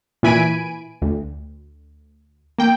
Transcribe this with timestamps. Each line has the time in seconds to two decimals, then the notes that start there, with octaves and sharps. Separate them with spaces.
0.23 A#2 E3 G#5 B5 D7 D#7
1.02 D2
2.58 A#3 G5